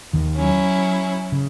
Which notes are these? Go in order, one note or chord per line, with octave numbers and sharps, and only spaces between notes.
D#2 D#3
F#3 C#4 E4
C#3